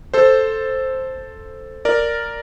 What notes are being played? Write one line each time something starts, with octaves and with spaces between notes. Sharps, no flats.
A4 C5
A#4 D5